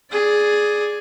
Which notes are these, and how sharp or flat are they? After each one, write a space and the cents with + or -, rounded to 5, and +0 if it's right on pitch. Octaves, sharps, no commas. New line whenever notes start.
G#4 +5 D5 +0